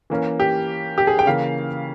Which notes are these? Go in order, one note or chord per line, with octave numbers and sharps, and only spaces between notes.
E3 A#3 C#4
G4
G4
G#4
G5
C#3 E3 A#3 C#4 F5